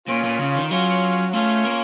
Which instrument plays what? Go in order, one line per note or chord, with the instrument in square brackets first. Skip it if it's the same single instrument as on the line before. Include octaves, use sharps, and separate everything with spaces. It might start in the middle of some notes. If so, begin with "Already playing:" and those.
[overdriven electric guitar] A#2 [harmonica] C#4 F4
[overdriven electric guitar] A#2
C#3
D#3
[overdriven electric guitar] F#3 [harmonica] C#4 F4
[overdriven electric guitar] A3 [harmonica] C#4 F4
[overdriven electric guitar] A#3